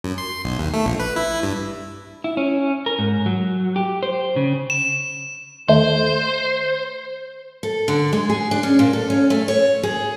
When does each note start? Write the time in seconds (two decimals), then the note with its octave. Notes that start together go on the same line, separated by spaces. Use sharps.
0.04 F#2
0.18 C6
0.45 B1
0.59 D#2
0.73 A3
0.86 A#1
1.00 B4
1.16 E4
1.43 G2
2.24 E4
2.37 C#4
2.86 A#4
2.99 G#2
3.26 F#3
3.76 G4
4.03 C5
4.36 C#3
4.70 E7
5.68 D#2 A3 C5
7.63 A4
7.88 D3
8.13 G#3
8.30 G#4
8.51 D4
8.63 C#4
8.79 A#2
8.93 A4
9.10 C#4
9.30 A3
9.48 C#5
9.83 G#4